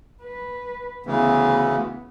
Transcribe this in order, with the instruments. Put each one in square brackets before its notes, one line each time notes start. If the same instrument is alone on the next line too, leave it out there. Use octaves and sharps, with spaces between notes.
[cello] B4
[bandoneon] D2 C#3 E3 [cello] B3